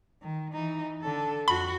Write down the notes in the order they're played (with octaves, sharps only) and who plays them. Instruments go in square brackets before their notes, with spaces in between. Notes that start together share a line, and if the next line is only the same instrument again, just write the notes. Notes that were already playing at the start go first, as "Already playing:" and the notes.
[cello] D#3
E3 D#4
D3 A4
[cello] F2 F#4 [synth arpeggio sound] B5